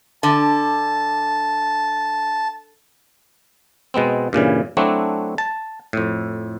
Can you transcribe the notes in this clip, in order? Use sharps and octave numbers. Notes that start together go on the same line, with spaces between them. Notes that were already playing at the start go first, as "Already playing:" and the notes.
D3 A5
B2 G#3 B3 C4
G2 A#2 C#3 E3
F#3 A3 C4 D4 E4 F#4
A5
F2 A2